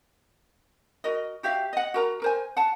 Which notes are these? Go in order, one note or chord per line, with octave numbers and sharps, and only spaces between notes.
F#4 A#4 D#5
F#4 G4 E5 F5
D#5 F#5
F#4 A#4 A#5
A#4 C5 G#5
F#5 A5